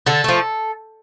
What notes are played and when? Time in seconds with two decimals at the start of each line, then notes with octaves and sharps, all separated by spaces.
0.06 D3 A4
0.24 F3 A3